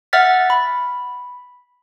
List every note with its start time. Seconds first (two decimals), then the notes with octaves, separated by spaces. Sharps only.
0.13 E5 F#5 F6 A6 B6
0.50 B5